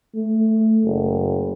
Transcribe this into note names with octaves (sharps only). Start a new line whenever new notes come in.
A3
F#1